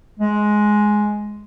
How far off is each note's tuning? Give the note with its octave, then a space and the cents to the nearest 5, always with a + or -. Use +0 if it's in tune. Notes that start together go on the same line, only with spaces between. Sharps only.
G#3 +10